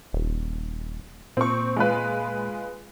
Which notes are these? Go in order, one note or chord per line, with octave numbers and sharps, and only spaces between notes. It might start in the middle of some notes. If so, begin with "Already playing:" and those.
D#1
A#2 C4 C#6
G#3 F4 B4